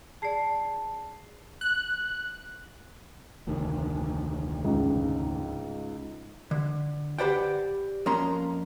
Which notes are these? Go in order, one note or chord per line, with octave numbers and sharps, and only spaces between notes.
G#4 D5 A5 C7
F#6
F1 D2 D#3
C#2 G#2
D3
G4 B4 C5 D5 F#5 G5
F2 A#3 C#4 A#5 C6